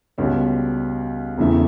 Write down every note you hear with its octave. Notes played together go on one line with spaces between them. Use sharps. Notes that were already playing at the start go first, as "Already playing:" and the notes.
C#2 B2 G3 C#4
E1 E2 C#3 E3 A3